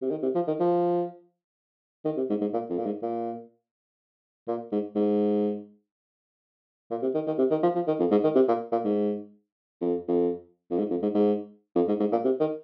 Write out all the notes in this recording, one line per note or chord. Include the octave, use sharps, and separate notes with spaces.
C3
D#3
C3
F3
D#3
F3
D#3
C3
G#2
G#2
A#2
F2
A#2
G#2
A#2
A#2
G#2
G#2
A#2
C3
D#3
D#3
C3
D#3
F3
F3
D#3
F2
G#2
D#3
C3
A#2
A#2
G#2
F2
F2
F2
G#2
F2
G#2
G#2
F2
G#2
G#2
A#2
C3
D#3